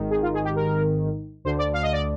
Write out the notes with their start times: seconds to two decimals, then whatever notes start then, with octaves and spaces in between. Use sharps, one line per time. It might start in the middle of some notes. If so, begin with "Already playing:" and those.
Already playing: G#1 G#2 D#3
0.11 G#4
0.22 F4
0.34 G#4
0.44 G4
0.56 A#4
1.44 D2 D3 C5
1.59 D5
1.73 F5
1.83 D#5
1.92 D5